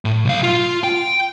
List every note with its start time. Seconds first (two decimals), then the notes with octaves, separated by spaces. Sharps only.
0.05 A2
0.25 B1 F5
0.43 F4
0.84 G5